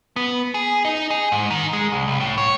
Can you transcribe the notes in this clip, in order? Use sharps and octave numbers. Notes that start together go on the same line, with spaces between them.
B3
G#4
D#4
G#4
G#2
D#3
G#3
C2
C2
A2
C#5